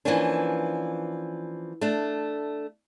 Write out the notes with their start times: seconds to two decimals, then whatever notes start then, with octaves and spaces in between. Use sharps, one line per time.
0.05 E3 F3 A#3 C#4 D4
1.81 A3 D4